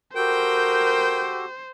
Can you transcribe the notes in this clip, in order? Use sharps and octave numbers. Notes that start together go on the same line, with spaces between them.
F#4 G4 A4 A#4 C5 G5